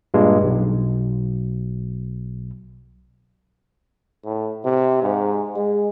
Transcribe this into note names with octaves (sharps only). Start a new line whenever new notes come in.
G2 A#2 G#3
B1
A2
C3
G#2
G#3